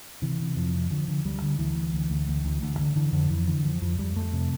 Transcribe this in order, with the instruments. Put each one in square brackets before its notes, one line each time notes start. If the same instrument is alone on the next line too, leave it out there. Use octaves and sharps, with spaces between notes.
[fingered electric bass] C3 E3
C3
F2 F3
C3
D3 F3
D3
D2 G3
D3
D2 E3
D2
D2
D2
D2
D2
D2
D3
D3 E3
F2 D3
F2 E3
D3 E3
F2 F3
F2 F3
F2 G3
F2 A3
C3